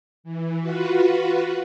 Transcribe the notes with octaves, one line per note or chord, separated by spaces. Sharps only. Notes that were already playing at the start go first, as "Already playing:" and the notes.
E3
F4 F#4 B4